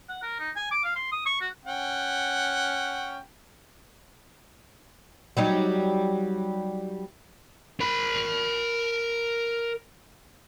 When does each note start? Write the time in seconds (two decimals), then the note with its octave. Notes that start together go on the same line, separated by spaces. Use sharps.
0.09 F#5
0.22 A#4
0.39 D#4
0.56 G#5
0.71 D6
0.84 F5
0.96 C6
1.12 D#6
1.26 C#6
1.41 F#4
1.65 C#4 F#5 G5
5.37 F#3 G3 D#4
7.80 A#4 B5